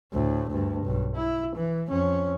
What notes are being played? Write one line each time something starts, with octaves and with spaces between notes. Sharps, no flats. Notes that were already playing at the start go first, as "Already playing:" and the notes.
D2 A2
D2 G2
B1 G2
E4
E3
F2 C#4